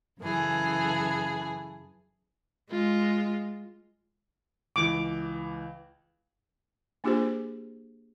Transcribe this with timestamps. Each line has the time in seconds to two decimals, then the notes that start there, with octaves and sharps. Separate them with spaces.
0.20 F#2 C#3 E3 G#4 A4
2.71 G#3 F4
4.76 C#2 E3 D6
7.04 A#3 D4 F4 G4 G#4 C5